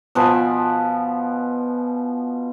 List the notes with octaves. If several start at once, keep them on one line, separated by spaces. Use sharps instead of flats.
B2 F3 G#5 B5